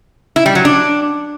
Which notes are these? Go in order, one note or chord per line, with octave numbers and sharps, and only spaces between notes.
E4
G3
F#3
D4